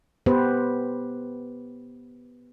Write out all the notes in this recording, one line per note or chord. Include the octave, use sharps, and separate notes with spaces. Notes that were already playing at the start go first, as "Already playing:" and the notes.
B3 G4 B4 C5